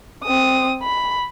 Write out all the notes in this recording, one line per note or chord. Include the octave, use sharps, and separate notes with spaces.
C4 D#6
B5